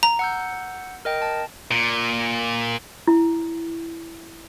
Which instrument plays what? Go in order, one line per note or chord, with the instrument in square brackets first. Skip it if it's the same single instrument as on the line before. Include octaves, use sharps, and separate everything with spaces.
[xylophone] A#5
[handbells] F#5 E6 G6
A#4 D#5 G5
A5
[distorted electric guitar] A#2
[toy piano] E4